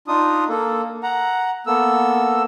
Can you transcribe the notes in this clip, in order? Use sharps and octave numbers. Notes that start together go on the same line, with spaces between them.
D4 D#4 F4 D#6
A#3 A4
F#5 A#5
A#3 B3 A4 E6